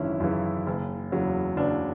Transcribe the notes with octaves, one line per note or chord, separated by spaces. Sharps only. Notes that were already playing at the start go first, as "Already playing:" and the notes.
Already playing: G#1 F#2 C#3 E3 C#4 D4 E4
F#2 C#3 E3
F#1
E2 C#3 F#3
F#1 D4